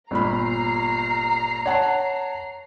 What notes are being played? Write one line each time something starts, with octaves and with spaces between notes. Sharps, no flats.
G1 A#2 A#5 B5 C7
C#5 F#5 A5